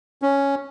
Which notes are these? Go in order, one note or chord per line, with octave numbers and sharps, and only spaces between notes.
C#4